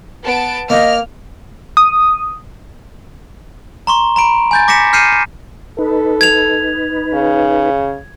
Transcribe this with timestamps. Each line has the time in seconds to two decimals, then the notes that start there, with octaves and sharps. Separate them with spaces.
0.25 B3 A5 D7
0.70 A#3 D#5 F6
1.77 D#6
3.87 A#5 C6 C#6
4.16 A#5 B5 D7
4.51 G#5 G6 A6
4.68 D6 A#6 B6 C#7 E7
4.93 F6 G6 C7 C#7 D#7 E7
5.79 D#4 A4 B4
6.21 G#6 F7
7.14 C#3